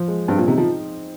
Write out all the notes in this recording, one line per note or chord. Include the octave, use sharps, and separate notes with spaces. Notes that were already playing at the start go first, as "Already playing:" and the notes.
Already playing: F3
G#3
G2 C4
A#2
C3 D#4
F3